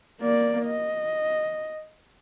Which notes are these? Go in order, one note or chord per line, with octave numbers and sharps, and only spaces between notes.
A#3 D5
D#5